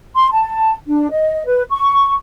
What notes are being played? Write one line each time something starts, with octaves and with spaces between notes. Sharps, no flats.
C6
A5
D4
D#5
B4
C#6